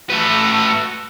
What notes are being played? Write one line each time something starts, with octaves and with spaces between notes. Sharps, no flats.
A3 F#4 A4 B4